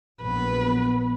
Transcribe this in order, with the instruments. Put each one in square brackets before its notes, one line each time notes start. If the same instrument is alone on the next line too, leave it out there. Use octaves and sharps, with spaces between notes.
[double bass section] A#1 F#3 B3 [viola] B4